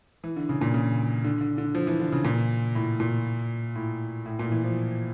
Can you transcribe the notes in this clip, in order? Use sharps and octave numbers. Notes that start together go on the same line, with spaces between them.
E3
D3
C#3
A#2
C#3
D3
D3
D3
F3
E3
D3
C#3
A#2
A2
A#2
A2
A2
A#2
E3
F3